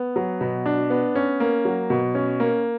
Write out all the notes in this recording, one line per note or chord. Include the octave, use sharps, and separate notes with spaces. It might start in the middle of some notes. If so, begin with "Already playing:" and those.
Already playing: B3
F#3
B2
D4
B3
C#4
A#3
F#3
B2
C#4
A#3